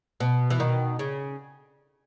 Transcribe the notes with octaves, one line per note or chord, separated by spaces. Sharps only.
B2
E3
B2 D#3
C#3